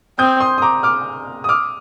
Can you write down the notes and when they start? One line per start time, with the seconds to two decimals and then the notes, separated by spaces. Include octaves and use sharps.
0.19 C4 D#6 G6
0.40 C6 D#6
0.58 D#6
0.62 A#5 D6
0.83 D6 F6
1.44 D#6
1.49 D6 F6